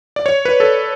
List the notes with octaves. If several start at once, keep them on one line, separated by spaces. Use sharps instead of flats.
D5
C#5
B4
A4